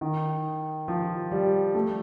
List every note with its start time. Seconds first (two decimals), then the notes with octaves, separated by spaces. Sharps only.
0.01 D#3
0.88 F3
1.31 G3
1.74 A3